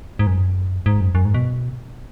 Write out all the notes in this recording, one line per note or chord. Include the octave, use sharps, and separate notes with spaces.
G#2
F#2
G#2
F#2
F#2
G#2
B2